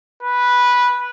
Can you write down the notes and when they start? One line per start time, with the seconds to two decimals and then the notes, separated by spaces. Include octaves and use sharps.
0.23 B4